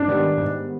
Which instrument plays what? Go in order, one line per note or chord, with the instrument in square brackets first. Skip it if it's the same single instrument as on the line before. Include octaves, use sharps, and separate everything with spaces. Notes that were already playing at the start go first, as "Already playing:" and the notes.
Already playing: [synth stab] G#2 [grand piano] D4
[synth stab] D#3 G3 B3
G#2